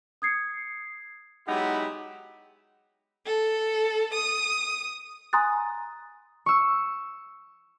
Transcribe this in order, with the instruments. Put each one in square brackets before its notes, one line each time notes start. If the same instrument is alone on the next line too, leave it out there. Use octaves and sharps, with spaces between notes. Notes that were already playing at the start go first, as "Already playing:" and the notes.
[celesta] D#6 G#6 C7 C#7
[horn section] F#3 G#3 B3 D#4 E4 G4
[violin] A4
D#6
[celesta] G#5 A#5 C6 D#6 F#6 A6
[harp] C#6 E6